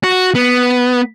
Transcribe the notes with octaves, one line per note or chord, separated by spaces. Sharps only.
F#4
B3